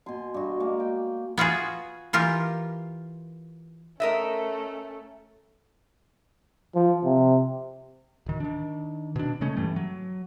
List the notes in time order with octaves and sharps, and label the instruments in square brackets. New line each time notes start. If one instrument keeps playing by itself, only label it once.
[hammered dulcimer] B2 G#5 C6
G2 F#4
G#3 A#3 A#5
G5
[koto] B3 F4 F#4 G#4
E3 F4 G4 A#4
[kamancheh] A3 C#4 [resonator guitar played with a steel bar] A#4 D#5 E5
[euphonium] F3
C3
[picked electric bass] D1 D#3
D#3 D4
B2 D4
C#3 G#3 A3 C#4
G2 E3 G3 A3
F#3